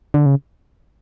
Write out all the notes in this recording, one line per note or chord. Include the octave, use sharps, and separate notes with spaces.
D3
C#3